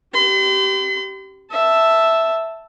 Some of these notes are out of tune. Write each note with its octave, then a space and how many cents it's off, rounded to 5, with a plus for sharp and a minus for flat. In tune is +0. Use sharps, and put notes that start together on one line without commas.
G4 -20 C6 -45
E5 +0 A5 +0